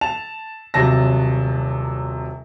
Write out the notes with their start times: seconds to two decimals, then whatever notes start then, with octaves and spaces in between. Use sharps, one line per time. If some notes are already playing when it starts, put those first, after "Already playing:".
0.01 A5 F7
0.74 D#1 C3 F#3 A5 A#6